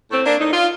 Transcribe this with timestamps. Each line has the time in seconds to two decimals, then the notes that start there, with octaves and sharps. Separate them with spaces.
0.10 A2 A3 C4
0.25 A#3 D4
0.39 A2 D#4
0.53 F4